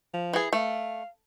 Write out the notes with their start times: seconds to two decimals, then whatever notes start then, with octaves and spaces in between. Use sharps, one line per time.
0.13 F3
0.33 E3 G#4
0.53 A3 F5